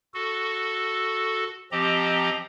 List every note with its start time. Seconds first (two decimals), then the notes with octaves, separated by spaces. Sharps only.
0.14 F#4 A4
1.72 F3 C4 G4 D#5 A#5